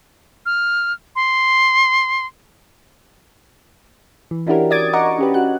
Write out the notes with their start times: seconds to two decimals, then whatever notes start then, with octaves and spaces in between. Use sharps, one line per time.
0.46 F6
1.16 C6
4.31 E3
4.47 C#4 D4 E4 F#4 G4 A#4
4.71 D5 D6 D#6 G#6 A6 D7
4.93 D#5 F#5 A#5 C#6 D6
5.18 C#4 G4 B4
5.34 F#4 F#6